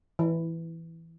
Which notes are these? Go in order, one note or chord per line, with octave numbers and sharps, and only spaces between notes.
E3